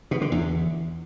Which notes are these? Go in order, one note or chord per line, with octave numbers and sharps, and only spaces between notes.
B2
D3
E2